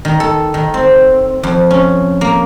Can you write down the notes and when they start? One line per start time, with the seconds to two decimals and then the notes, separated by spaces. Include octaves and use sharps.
0.05 D#3
0.20 A4
0.54 D#3
0.74 C4
1.43 F2
1.71 C#4
2.21 A#3